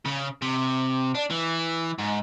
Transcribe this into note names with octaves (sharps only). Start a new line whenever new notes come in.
C#3
C3
D4
E3
G#2